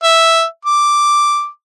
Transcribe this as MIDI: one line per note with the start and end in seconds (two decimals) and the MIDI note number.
0.03 0.44 76
0.65 1.47 86